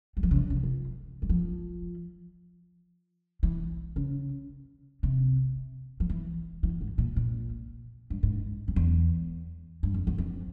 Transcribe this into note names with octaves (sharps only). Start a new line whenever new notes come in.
G3
F3
C#3
E3
C3
F3
G3
F3
E3
C#3
C3
F3
E3
E3
G#2
A#2
A#2
G2
G#2
F2
E2
G2
F2
E2
F2